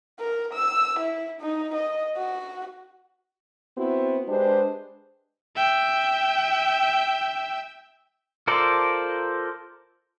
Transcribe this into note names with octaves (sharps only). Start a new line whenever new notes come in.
A#4
E6
E4
D#4
D#5
F#4
B3 C4 E4 F#4
G#3 D4 G4 B4 C5
E5 G5
F4 A4 A#4 C5 D5